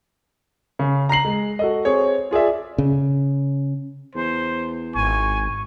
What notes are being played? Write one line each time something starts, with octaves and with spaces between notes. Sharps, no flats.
C#3
A#5 A#6 C7 F#7
G#3
F#4 A4 D#5
C4 G#4 C#5
F4 G#4 D5 E5
C#3
E2 C5
G#1 G#5 C#6